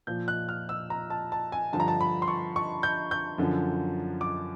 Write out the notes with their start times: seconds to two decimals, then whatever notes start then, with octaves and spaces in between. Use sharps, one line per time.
0.07 A#2 F3 G6
0.28 F#6
0.49 F6
0.69 E6
0.90 A#5
1.10 A5
1.32 A5
1.52 G#5
1.73 G2 D3 F3 A5
1.80 A#5
1.88 A5
2.01 B5
2.22 C6
2.28 C#6
2.56 C#6
2.83 G6
3.11 G6
3.38 F#2 D3 F3
4.21 D6